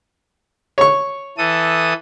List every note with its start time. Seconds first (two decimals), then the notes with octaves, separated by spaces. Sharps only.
0.78 C#5 C#6
1.38 E3 A4 D#6